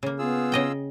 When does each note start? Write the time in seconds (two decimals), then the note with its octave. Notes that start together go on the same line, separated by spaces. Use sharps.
0.03 C#3 A#3
0.19 B3 F4 G#4 E6
0.52 C#3 D#5 G5